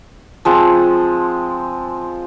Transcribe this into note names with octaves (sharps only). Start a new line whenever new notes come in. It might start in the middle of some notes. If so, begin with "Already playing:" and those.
F3 G#3 C4